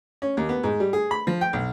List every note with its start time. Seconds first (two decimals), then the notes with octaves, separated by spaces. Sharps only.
0.22 C#4
0.37 D#2
0.49 B3
0.63 G#2
0.80 G3
0.93 G#4
1.11 B5
1.27 F3
1.41 G5
1.53 B1